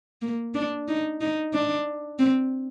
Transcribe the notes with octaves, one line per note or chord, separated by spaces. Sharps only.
A#3
D4
D#4
D#4
D4
C4